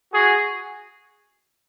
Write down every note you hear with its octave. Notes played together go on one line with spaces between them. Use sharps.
F#4 G#4